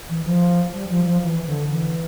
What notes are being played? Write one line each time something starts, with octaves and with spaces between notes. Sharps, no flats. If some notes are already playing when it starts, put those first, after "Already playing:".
E3
F3
G3
F3
F3
E3
D3
E3